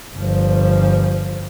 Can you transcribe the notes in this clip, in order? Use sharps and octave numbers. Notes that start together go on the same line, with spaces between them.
G1 F3